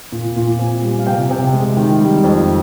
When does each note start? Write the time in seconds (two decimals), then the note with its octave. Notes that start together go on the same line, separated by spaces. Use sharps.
0.12 A#2
0.36 A#2
0.59 C4 G#5
0.83 G3
0.99 F5
1.06 C3 G5
1.31 C3
1.53 G#3
1.77 D#3
2.01 G3
2.24 F2